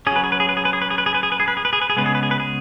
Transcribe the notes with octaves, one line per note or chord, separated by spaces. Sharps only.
C#4 G#4
F#3 B4
G#4
B4
G#4
B4
G#4
B4
G#4
B4
G#4
B4
G#4
B4
G#4
B4
G#4
B4
G#4
B4
G#4
B4
G#4
C#3 G#3 B3 B4
G#4
B4
G#4
B4
G#4